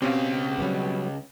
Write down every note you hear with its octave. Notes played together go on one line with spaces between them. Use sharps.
C#2 B2 C4 C#4 G4 F5
F#3 G3 B3